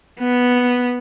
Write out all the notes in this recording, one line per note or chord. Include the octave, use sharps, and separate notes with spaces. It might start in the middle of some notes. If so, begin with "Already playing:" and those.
B3